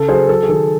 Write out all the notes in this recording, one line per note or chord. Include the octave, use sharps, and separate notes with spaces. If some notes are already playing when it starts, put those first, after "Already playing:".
Already playing: C#3 A4
F#3 G#4 C5
F#3 A4
G#4
D#3 A4